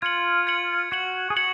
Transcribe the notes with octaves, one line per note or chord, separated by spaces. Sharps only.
F4 G#6 C#7 F#7
G#6 C#7 F#7
F#4 G#6 C#7 F#7
G#4
F#4 G#6 C#7 F#7